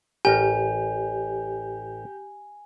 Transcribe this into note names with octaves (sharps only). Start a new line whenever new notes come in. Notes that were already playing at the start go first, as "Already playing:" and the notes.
A1 G4 A#4 G#5